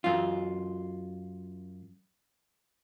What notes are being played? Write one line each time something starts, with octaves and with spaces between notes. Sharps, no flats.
F#2 F4